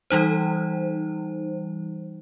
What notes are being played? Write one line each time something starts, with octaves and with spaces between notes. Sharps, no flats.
E3 G3 D#4 C5